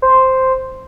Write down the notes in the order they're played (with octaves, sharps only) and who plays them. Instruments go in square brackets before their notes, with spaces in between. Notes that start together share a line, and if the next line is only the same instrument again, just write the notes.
[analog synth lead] C5